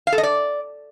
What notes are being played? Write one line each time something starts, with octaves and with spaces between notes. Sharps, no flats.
F5
A4
D#5
D5